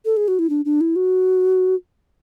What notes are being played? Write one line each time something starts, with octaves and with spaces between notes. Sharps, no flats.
A4
G#4
F#4
E4
D4
D4
E4
F#4